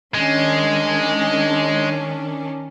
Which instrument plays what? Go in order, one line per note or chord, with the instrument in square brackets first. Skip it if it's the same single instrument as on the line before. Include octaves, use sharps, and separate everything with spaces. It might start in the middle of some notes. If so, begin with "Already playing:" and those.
[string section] D#3 C#4 D4 [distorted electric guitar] G#3